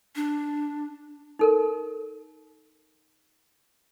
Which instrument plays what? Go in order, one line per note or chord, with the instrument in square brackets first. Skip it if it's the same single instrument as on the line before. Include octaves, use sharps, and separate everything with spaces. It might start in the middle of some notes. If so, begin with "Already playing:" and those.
[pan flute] D4
[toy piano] D#4 A4 A#4